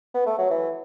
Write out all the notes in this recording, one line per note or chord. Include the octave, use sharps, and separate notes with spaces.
B3
A3
F#3
E3